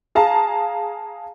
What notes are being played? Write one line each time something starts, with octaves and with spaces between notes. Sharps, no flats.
G#4 F5 A5 A#5